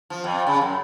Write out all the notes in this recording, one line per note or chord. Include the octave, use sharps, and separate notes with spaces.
F3
F2
C#3
F#2